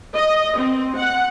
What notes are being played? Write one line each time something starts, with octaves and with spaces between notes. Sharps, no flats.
D#5
C4
F#5